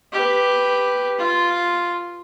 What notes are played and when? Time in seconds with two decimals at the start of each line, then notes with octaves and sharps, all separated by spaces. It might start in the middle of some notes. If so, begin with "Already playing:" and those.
0.12 G4 B4
1.19 F4